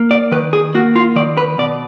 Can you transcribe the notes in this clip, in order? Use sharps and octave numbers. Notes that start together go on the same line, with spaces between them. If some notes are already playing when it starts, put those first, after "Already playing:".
Already playing: A#3
D5
D#3 B4
G#4
A#3 F#4
F4
D#3 D5
B4
B2 D5